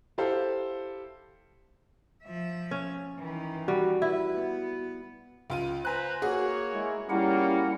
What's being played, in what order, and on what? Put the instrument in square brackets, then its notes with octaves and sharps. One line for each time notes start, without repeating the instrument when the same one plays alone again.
[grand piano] E4 G4 A4 C5 F5
[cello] F3 E5
[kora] C#4
[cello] D#3 E3
[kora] G3 [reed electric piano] F#4
[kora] E4 [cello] B4
[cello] B3
[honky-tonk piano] C#2 F4 D#7
[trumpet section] B4 C5 A#5 [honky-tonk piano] G#5 F#6
[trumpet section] A#3 C#5 [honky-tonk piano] F#4 G#4
[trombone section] G#3 E4
[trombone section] G3 C#4 [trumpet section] A#3 F4 [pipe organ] E4 F#5